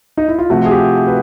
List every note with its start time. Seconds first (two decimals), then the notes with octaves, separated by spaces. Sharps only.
0.17 D#4
0.28 E4
0.39 F4
0.50 C3 F3 A3 F#4
0.66 G#4
0.71 G4
1.07 B4